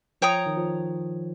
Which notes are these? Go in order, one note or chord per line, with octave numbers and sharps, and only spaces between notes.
F3 C#5 G5 A#5 D#6
D#3
F3